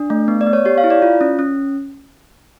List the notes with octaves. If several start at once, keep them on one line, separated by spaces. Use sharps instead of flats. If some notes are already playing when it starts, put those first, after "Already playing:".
Already playing: D4
A3
B3
D5
B3
C#5
G4 C#5
F5
E4
D5
F4
C#4
C#4